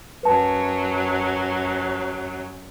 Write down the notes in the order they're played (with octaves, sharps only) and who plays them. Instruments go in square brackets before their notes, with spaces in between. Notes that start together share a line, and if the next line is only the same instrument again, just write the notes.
[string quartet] F#2 F#3 [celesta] B4 A5